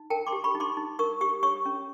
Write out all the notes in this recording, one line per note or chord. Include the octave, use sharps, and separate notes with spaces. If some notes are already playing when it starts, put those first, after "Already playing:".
Already playing: D#4
A#4 G5 A5
C6 D6
G4
B5 C#6
D#4
C6 D6
D#4
A#4 C#6 D#6
G4 C#6 D#6
C#5 C#6 D#6
C#4